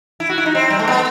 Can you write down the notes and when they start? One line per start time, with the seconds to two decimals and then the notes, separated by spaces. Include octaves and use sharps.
0.20 E4
0.29 F#4
0.38 E4
0.46 D#4
0.55 C4
0.70 G3
0.79 A3
0.88 B3